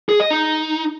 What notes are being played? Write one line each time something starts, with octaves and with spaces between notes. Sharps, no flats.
G#4
D#5
D#4